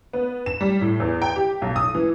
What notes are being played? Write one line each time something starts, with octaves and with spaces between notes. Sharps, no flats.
B3
E7
G3
A2
E2
G5
G4
B1
D#6
E3